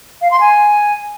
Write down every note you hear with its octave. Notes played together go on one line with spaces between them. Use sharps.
F5
C6
G#5